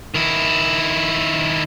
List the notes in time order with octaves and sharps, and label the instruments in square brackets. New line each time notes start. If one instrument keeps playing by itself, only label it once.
[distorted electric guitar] D#3 E4